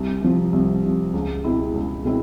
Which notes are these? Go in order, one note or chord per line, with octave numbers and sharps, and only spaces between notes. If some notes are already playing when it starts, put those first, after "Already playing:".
Already playing: C2
C3 F3
C2
C3 F3
C#2
B2 G#3 C4 E4
C#2
B2 G#3 C4 E4